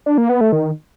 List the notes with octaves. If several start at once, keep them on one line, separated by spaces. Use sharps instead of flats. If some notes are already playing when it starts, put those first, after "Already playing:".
D4
A#3
B3
A3
D#3